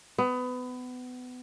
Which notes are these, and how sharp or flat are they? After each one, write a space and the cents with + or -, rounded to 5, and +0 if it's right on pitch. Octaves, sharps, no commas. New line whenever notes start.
B3 +25